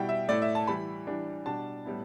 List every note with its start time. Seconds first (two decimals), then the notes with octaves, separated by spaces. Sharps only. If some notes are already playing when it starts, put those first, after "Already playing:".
Already playing: B2 G3 E4 G5
0.09 E5
0.28 A2 A3 E4 D5
0.42 E5
0.55 A5
0.67 E3 G3 E4 B5
1.07 E3 G3 D4
1.46 B2 G3 D4 A5
1.85 A2 G3 B3 E4